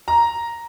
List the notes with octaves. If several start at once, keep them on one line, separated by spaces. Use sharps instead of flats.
A#5